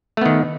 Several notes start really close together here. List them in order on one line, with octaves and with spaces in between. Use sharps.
A3 B3 D#3